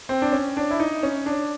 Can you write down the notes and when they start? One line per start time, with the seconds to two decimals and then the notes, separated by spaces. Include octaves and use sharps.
0.09 C4
0.22 D4
0.32 C#4
0.57 D4
0.71 E4
0.80 D#4
1.03 C#4
1.26 D4